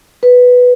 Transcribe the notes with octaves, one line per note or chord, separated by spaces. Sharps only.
B4